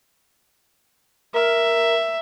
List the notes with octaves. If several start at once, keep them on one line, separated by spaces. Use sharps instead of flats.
A#4 E5